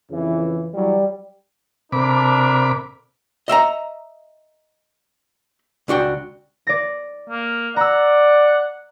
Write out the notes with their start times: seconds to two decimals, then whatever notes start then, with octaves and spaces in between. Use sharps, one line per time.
0.10 F2 C#3 E3
0.74 E3 F#3 G3
1.92 C3 D4 A4 A#4 B5 D6
3.48 D#5 E5 G5 A#5
5.88 C#2 D4 F#4 G5
6.67 D5 A#6
7.30 A#3
7.76 D5 F#5 A#5 E6